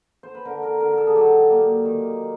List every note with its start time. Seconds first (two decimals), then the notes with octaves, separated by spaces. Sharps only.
0.23 C5
0.35 B4
0.45 D3 A#4
0.63 A#4
0.80 D3 A#4
0.91 A#4
0.98 A4
1.07 G#4
1.15 F#3 G4
1.50 A#3
1.85 D#3